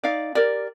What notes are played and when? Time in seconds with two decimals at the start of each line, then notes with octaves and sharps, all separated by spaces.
0.03 D#4 D5 F5
0.35 G4 A#4 D5